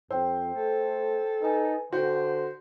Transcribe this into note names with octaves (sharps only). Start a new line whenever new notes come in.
F2 C5 G5 E6
A3 A4
D#4 B4 G#5
D3 F#4 C5 G5 G6